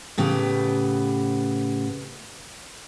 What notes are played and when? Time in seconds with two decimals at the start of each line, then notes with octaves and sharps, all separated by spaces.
0.18 A2 C#3 B3 G4